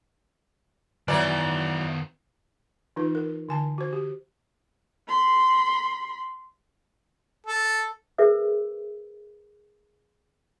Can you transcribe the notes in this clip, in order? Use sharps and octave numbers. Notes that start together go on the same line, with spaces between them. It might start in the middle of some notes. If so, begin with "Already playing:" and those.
D#3 E3 F#3 B3 D5
E3 D#4 F4 B4
A#4
D3 G#5 A5
F#4 C5
G4
B5 C6
A4
G#4 A#4 B4 E5 E6